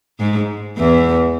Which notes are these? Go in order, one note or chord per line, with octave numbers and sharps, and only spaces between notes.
G#2 G#3
E2 E3